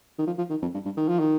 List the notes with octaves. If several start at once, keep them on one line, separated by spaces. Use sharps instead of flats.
D#3
F3
F3
D#3
F2
G2
G2
D#3
F3
D#3